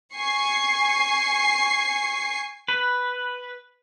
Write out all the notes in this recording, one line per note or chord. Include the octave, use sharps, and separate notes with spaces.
G#5 C#6 C7
B4